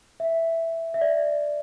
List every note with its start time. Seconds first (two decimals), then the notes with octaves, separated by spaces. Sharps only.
0.20 E5
0.94 E5
1.01 D5